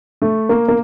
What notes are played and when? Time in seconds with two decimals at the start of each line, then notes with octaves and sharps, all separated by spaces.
0.22 A3
0.49 A#3
0.68 A#3